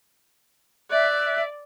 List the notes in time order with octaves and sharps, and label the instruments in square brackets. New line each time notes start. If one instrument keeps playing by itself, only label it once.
[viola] D5 [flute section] E5 [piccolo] F#6